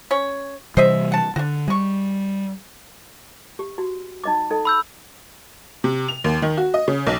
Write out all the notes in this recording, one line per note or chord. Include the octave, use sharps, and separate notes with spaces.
C#4 C#5
C3 E3 G3 C5 D#5 E5
F#5 A5
D3 D4 F#4
G3 G#3 C#6
G4
F#4
D#4 D#5 D6
D#4 A4 D#5
B5 E6 G6
C3
F7
D#2
D#3
F#4
D#5
C#3
B1